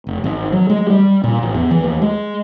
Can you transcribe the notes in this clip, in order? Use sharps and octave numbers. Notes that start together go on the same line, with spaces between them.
F1
G#1
F#3
G#3
G3
A#2
A1
E2
E3
D#2
G#3